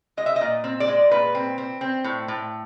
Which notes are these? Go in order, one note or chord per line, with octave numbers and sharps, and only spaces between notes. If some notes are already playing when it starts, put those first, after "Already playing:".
G#3 D#5
E5
D#5
A#2
C4
D5
G#3
A#2 B4
C4
C4
C4
A2
A2